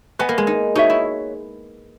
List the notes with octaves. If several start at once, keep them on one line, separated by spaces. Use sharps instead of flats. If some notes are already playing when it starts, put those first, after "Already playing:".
B3 B4 D#5 G#5
A#3
G#3
D#4
D#4 F#4 C#5 E5
E4